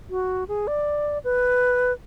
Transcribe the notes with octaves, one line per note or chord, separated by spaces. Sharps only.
F#4
G#4
D5
B4